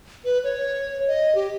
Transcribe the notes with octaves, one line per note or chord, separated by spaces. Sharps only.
B4
C#5
D#5
G4